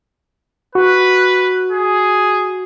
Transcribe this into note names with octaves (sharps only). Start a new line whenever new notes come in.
F#4 B4
G#4